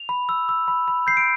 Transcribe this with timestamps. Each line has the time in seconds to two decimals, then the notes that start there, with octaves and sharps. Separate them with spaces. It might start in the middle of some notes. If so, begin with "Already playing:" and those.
Already playing: F7
0.09 B5
0.29 E6
0.49 E6
0.68 B5
0.88 B5
1.07 G6 C7
1.17 D7